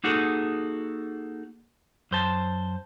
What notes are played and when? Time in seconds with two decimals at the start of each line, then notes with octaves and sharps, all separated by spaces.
0.04 A#3 D#4 F#4 G#4 A4
2.11 F#2 C5 A5